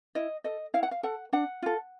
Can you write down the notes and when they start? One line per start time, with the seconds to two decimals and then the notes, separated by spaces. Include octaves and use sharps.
0.15 E4 D#5
0.44 A4 D#5
0.74 E4 F5
0.83 F#5
0.91 F5
1.03 A4 F#5
1.33 D4 F#5
1.62 F4 A4